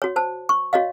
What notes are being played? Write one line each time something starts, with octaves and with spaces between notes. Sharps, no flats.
F#4 C#5
C5 A5
C#6
F#4 C#5 D#5 F5